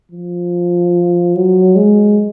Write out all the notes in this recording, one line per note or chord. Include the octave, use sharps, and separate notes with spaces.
F3
F#3
G#3